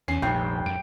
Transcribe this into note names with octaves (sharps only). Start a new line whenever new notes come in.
E2 C#4 C7
F1 A#1 G2 C#5 G5
F#2 D7